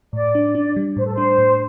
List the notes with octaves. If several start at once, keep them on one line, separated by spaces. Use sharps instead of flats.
A2 D5
D4
D4
G3
A2 C5
A4
D4 C5
A2